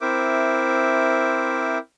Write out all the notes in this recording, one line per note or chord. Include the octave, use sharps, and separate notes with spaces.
C4 E4 A#4 C5 E5 D6